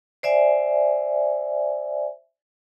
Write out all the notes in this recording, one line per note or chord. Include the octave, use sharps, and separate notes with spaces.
C5 D5 E5 G#5